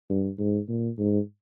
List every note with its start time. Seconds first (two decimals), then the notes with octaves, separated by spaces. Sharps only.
0.10 G2
0.39 G#2
0.69 A#2
0.98 G#2